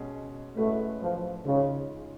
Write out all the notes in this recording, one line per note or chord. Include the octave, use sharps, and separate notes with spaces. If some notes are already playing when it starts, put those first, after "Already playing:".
Already playing: B2 G#3 C#4 G#4
A2 G#3 A3 C#4 F#4 B4
F3
G#2 C#3 G#3 C#4 F4